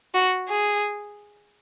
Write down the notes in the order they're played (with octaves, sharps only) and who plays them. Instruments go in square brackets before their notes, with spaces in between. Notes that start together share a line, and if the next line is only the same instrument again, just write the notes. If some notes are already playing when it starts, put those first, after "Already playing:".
[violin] F#4
G#4